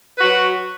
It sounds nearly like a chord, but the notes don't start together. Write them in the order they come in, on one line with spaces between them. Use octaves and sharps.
B4 F#4 F#3